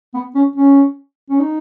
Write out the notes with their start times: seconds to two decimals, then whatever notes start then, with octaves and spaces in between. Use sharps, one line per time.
0.14 B3
0.35 C#4
0.56 C#4
1.30 C#4
1.40 D#4